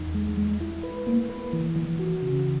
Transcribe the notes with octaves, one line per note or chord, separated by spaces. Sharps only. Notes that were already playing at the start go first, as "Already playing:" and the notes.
Already playing: E2 D#4
G#3
G#3
E4
B4
A#3
B4
E3
E3
F#4
C#3